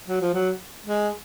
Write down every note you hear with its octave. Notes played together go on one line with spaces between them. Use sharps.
F#3
F3
F#3
G#3